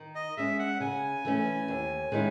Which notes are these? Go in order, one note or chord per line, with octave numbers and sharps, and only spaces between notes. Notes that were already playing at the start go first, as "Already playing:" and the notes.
Already playing: D#3
D#5
G#3 C#4 E5
F#5
C#3 G#5
E3 A3 C#4
D#2
D#3 G#3 C#4 E4